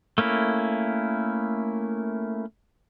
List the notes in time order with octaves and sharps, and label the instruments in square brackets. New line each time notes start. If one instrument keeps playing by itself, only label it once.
[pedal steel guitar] A3 A#3 C#4 E4